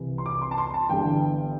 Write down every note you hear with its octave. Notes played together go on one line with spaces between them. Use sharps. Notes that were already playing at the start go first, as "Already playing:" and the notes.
Already playing: C2 C3 E3
C6
D6
C6
A5
C6
A5
G1 G2 E3 G5